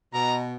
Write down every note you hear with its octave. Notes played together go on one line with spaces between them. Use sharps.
B2 A#5